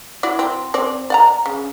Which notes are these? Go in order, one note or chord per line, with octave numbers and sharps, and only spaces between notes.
E4 F#4 D5
C4
C4 C5 D5
D5 F#5 A#5
C#3